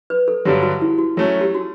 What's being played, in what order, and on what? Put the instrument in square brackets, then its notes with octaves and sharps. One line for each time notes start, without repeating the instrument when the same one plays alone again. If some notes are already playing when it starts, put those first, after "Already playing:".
[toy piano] B4
A4
[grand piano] G2 D3 F#3 [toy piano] G4
[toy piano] F#4
E4
F#4
[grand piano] F#3 A3 C#4 [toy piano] A4
[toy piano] G4
F#4